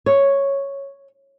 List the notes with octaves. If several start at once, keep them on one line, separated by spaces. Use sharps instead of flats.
C#5